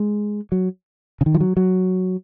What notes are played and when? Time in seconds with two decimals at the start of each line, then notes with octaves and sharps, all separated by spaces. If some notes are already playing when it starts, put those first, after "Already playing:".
Already playing: G#3
0.52 F#3
1.21 C#3
1.26 D#3
1.35 F3
1.40 F#3
1.57 F#3